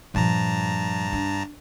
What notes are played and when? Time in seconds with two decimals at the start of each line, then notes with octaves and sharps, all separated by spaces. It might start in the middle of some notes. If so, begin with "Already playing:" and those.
0.14 G2 A#2 F3 A5 A#5
1.13 D4